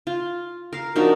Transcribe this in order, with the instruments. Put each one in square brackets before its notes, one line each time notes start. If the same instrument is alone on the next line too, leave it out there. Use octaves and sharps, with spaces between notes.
[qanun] F4
A#4 F5
[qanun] F3 D4 D#4 [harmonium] F#4 A#4